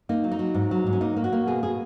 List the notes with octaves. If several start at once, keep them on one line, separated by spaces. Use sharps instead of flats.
A#3 D#4
F#3
D#4
F#3
G#2
F#3
G#2
C#4
A#3 D#4
A#3
F#4
A#3
B2 G#4
B2 G#4